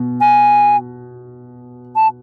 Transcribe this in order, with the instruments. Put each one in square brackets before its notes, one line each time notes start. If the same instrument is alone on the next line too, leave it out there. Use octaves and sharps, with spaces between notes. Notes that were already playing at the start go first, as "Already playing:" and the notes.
Already playing: [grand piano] B2
[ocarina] G#5
A5